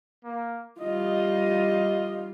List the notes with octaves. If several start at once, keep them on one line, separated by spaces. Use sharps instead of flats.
A#3
G3 F4 D#5